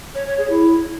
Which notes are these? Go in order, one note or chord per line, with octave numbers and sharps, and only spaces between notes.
C#5
C#5
G#4
E4